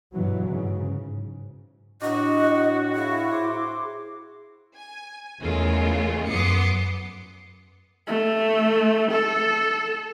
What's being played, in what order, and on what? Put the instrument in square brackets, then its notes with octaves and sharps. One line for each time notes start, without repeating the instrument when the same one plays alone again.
[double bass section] G2 B2 E3 F#3
G#2 C#3
[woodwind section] A2 F#4 [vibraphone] D4 B4 [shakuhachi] D#5
[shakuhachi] E4 [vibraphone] G#4 F5
[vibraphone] G#4 [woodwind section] C5 C6 D6
[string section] G#5
E2 C#3 G#3 A3 F4 A#4
F#2 B3 C6 D6 D#6 C#7
[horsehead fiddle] A3
A4